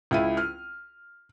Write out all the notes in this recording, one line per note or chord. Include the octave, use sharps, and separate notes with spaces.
C#2 E4 D#7
F6